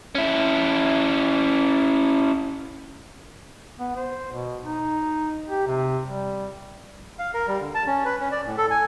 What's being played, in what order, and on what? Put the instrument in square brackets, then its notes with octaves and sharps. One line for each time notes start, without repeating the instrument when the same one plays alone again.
[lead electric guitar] C#4 E4
[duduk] B3
C5
B2
D#4
G4
C3
G3
[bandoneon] F5
A#4
G3
D3
A5
C#4
B4
C#4
D5
A2
A4
G#5